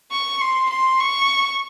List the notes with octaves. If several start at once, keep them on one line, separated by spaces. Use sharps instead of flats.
C#6
C6
C6
C#6